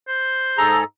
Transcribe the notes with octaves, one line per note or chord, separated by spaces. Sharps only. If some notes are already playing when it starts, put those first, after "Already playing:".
C5
G#2 G#4 A4 A#5